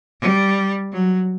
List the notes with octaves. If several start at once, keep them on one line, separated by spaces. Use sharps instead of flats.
G3
F#3